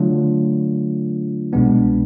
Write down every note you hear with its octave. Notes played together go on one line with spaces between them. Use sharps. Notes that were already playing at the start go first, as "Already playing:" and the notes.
Already playing: D3 F#3 A3 D4 F4
C2 B2 G#3 B3 D4